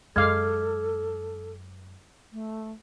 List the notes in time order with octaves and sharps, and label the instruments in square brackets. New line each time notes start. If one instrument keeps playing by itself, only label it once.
[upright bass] F#2 [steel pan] G#3 F5 [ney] A4 [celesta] D6 F6 G#6
[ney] A3